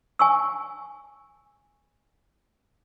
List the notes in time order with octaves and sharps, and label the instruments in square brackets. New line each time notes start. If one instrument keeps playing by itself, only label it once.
[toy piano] G#5 C#6 E6